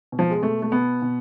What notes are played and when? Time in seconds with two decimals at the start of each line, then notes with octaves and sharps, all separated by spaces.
0.12 B2
0.19 F3
0.30 G#3
0.42 B2 A3
0.62 A3
0.72 B2 B3
1.02 B2